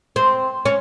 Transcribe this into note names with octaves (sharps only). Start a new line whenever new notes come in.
C4
C#4